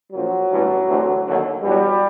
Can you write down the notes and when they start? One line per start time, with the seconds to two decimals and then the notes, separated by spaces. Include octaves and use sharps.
0.12 A#1 A#2 F3 F#3
0.50 A1 G2 E3
0.87 D2 C3 E3
1.25 D#2 D3 F#3
1.62 E2 B2 F#3 G3